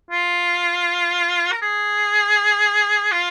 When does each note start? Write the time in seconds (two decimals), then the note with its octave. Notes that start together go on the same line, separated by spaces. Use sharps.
0.10 F4
1.52 A#4
1.62 G#4
3.12 F4